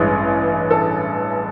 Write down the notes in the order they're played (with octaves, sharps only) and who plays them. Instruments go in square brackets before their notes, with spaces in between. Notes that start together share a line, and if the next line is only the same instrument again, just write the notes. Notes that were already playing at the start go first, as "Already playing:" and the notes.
Already playing: [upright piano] A1 G2 E3 G#3
A4